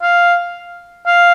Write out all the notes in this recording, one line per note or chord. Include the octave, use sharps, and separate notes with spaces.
F5
F5